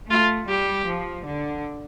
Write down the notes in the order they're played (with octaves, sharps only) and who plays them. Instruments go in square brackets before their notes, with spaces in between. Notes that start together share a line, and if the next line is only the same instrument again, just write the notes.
[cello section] A3 [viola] F4
[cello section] G3 [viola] G4
[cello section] F3
D3